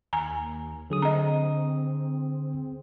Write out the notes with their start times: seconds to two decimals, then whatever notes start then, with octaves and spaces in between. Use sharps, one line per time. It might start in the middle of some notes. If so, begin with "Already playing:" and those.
0.13 D#2 G#5 A#5
0.90 D3 F#3 G#4 D#6
1.02 C4 D#5 A#5